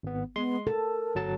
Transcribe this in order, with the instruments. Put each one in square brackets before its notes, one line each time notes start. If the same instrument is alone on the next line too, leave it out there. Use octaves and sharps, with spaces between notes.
[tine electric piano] G#1 B3
[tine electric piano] G#3 C6 [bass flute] B3
[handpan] A4 [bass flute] A#4 [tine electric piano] A5
[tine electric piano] G1 F#3 A5